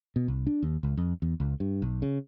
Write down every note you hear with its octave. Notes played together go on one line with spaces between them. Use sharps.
B2
C2
D4
D#2
C#2
F2
E2
C#2
G2
B1
C#3